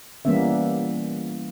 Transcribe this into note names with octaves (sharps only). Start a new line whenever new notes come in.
E3 G3 A#3 B3 C#4 E5